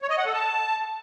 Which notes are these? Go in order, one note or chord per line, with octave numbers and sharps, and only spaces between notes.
C#5
D#5
F#5
A4
A5